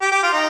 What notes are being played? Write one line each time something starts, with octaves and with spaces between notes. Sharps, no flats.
G4
G4
F4
D#4